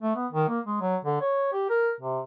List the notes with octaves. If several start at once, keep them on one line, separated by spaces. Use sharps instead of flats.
A3
B3
D#3
A#3
G#3
F#3
D3
C#5
G4
A#4
C3